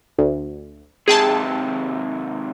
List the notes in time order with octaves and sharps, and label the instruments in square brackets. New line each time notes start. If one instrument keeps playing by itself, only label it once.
[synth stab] D2
[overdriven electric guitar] D#2 C3 [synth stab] G#4 G5 A5